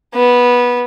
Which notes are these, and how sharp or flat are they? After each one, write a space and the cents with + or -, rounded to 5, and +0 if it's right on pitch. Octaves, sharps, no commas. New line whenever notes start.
B3 -15